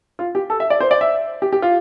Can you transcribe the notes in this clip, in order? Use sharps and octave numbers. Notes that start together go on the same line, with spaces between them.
F4
G4
A4
E5
D5
C5
D5
E5
G4
G4
F4